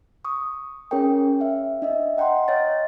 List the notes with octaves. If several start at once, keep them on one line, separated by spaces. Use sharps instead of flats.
C#6 D#6
C#4 G#4 A#4 C#5 G5
E5 F5
D4 D#5 E5
D#5 F#5 G5 A#5 C6
C#5 D#5 F5 A6